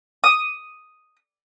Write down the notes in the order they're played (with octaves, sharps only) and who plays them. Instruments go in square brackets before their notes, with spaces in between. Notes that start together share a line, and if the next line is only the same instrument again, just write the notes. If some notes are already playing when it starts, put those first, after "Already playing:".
[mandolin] D#6